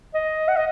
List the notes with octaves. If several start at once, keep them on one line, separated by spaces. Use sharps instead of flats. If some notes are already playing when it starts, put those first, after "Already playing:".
D#5
F#5
D#5